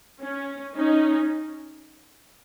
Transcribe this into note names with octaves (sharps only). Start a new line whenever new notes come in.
C#4
C#4 D#4